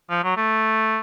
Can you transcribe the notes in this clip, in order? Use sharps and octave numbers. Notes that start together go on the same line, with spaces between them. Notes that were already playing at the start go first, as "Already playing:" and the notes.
F3
F#3
A3